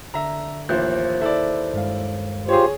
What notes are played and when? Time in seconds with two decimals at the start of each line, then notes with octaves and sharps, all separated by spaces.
0.14 D3 E5 A#5
0.69 A1 D#2 F3 C5 E5 F#6 G6
1.21 E4 A4 D5
1.74 G2 G#3 F5
2.48 F4 G4 G#4 C5 C#5